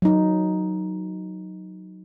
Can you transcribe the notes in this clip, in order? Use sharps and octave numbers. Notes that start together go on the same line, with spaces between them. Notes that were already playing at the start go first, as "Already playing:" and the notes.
F#3 D#4